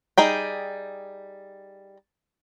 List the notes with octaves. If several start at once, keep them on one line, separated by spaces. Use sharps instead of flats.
G3 D#4 G#4 G5